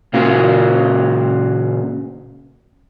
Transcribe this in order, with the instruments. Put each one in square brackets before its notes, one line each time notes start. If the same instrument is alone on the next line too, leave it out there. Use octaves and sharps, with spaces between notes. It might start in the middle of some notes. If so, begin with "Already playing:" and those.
[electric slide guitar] A#2 C#3 A#3 F4 F#4